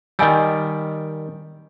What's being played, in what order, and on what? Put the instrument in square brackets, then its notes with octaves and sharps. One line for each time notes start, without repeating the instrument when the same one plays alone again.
[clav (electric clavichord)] D#3 G3 [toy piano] D#5 G#5 E6